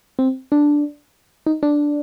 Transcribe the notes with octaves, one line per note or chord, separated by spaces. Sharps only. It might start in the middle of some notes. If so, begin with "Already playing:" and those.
C4
D4
D#4
D4